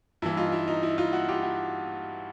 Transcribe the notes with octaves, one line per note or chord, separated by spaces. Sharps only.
G2 E3 E4
D#4 F4
E4
D#4
E4
D#4 F4
E4 F#4
F4 G4
E4 F#4